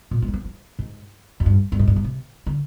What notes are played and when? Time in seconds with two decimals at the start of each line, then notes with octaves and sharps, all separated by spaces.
0.11 A#2
0.22 G#3
0.28 G3
0.34 F3
0.45 F3
0.79 G#2
1.40 F2
1.46 G2
1.72 G2
1.79 G#2
1.87 G2
1.96 G#2
2.04 C3
2.47 D3